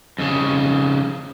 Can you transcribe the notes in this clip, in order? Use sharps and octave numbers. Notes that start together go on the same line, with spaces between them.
F2 C#3